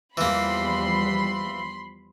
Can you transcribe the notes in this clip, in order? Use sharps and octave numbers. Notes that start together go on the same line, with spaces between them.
E2 E3 F3 G3 A#3 B5 C6